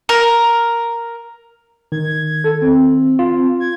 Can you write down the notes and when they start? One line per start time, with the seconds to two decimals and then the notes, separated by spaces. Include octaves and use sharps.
0.09 A#4
1.92 D#3 G#6
2.44 A4
2.61 C4
3.19 F4
3.60 G#6